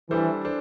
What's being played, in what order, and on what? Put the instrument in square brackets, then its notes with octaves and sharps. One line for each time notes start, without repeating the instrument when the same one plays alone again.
[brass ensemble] E3 [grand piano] G3 D4 A4 C5
[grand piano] D4 A4 C5